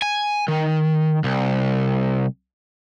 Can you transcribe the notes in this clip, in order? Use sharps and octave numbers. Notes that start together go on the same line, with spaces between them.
G#5
D#3
C2